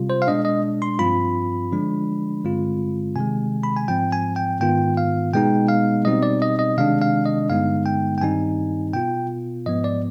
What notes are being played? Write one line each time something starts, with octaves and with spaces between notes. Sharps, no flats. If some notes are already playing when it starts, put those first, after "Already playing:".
Already playing: C3 G3 F4
C5
F5
B2 G#3 D4 D#5
D#5
C6
G2 F3 C4 F4 B5
D3 F3 G#3 D4
G2 D3 G#3 C4 F4
C3 D#3 G#3 G#5
B5
G#5
G#2 F3 C4 G5
G#5
G5
G#2 D#3 B3 F4 G5
F5
B2 G#3 B3 D#4 G5
F5
B2 G3 C4 D#4 D#5
D5
D#5
D#5
C3 D#3 G#3 D4 F5
F5
D#5
G2 D3 G#3 B3 D#4 F5
G5
G5
G2 D#3 G3 C4 D#4 G#5
B2 B3 F4 G5
G#2 F3 B3 D#5
D5